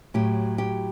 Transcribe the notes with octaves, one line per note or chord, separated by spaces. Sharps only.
A2 F#3 G4
G4